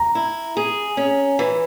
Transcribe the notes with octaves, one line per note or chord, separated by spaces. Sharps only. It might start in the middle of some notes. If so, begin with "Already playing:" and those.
Already playing: A#5
E4
G#4
C#4
E3